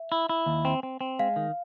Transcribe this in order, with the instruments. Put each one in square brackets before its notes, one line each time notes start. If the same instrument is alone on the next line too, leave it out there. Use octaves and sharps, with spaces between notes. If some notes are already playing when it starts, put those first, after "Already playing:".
Already playing: [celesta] E5
[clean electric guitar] E4
E4
D#2
C4
C4
C4
[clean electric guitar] G#3 [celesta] F5
[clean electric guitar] D#3